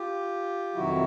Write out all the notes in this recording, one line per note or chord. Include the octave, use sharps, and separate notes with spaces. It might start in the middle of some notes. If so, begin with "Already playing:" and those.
Already playing: F4 G4
F2 C3 D#3 F#3 E4 F#4